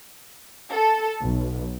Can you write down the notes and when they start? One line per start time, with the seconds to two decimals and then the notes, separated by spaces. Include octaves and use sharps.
0.73 A4
1.22 B1